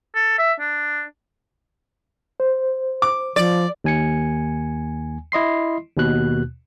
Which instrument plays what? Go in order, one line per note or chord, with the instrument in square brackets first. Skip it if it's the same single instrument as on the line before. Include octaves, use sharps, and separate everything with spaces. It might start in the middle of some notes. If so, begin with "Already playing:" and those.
[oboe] A4
E5
D4
[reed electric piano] C5
[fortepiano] D6
[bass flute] F3 [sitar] D5
[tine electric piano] D#2 G#5 C#7
E4 D#5 C6 C7
D#2 B2 F#6